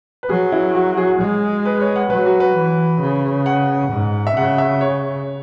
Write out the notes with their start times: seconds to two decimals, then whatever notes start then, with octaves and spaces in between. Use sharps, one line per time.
0.23 B4
0.29 F#3 G#4
0.52 E4
0.75 F#4
0.98 G#4
1.21 G#3
1.66 B4
1.81 C#5
1.96 F#5
2.10 F#3 B4
2.26 F#4
2.40 B4
2.56 E3
3.01 C#3
3.46 F#5
3.92 G#2
4.27 E5
4.36 C#3 F#5
4.58 E5
4.81 C#5